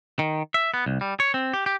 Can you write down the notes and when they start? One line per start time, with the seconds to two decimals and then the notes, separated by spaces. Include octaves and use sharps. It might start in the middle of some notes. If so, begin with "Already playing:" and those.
0.19 D#3
0.54 E5
0.74 B3
0.86 C2
1.01 G3
1.20 C#5
1.34 C4
1.53 G4
1.66 G4